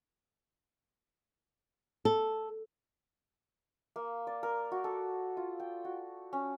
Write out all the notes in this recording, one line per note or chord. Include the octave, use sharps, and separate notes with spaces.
A4
A#3
D5
A#4
F#4
A4
F4
G5
F#4
C#4